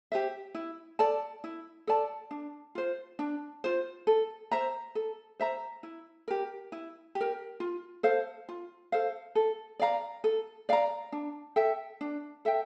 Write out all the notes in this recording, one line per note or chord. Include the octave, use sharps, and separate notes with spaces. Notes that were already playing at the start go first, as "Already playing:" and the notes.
G4 C5 E5
E4
A4 D5 A5
E4
A4 D5 A5
D4
F4 C5
D4
F4 C5
A4
C5 E5 A#5
A4
C5 E5 A#5
E4
G4 A#4
E4
G4
A#4
F4
A4 C5 F5
F4
A4 C5 F5
A4
D5 F5 A#5
A4
D5 F5 A#5
D4
A4 E5 G5
D4
A4 E5 G5